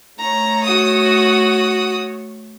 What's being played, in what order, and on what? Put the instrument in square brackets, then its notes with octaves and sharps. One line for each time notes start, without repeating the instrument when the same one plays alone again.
[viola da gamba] A3 C#5 [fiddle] A#5
[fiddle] F#4 D#6